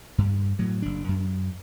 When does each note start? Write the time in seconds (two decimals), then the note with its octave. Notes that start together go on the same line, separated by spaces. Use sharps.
0.18 G2
0.59 A2 F#3
0.82 F#1 D4
1.09 F#2